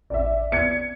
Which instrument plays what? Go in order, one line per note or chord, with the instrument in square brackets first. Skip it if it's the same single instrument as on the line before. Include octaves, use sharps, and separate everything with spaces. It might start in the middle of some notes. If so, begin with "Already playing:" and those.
[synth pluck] A1 [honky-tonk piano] D5 E5
[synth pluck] B3 D5 [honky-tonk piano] G#6 C#7